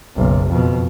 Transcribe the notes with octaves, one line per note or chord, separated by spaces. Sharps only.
F#1 B1
F2 B2